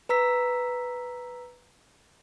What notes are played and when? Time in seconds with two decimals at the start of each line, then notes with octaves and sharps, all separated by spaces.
0.09 B4 A#5 E6 B6